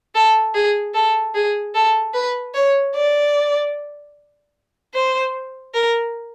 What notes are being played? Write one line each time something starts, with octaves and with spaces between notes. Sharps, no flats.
A4
G#4
A4
G#4
A4
B4
C#5
D5
C5
A#4